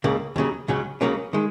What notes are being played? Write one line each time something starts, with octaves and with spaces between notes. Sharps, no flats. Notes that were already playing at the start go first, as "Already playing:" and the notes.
C#2 C#3 A#3
D#2 C#3 F#3
C#2 C#3 F#3 C#4
C#2 C#3 F#3 A#3 C#4
D#3 G#3